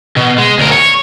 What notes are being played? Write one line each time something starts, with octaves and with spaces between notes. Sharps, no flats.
B2
G#3
D2 A#4
C#5